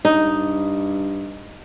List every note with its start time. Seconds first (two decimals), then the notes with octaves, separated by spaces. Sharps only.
0.05 G2 D#4